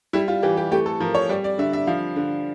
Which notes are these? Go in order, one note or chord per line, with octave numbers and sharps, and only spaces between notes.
G3 E4
F4
E3 G4
G4
A3 G4
A4
F3 A#4
C#5
G3 D5
D5
D3 E5
E5
F3 F5
D3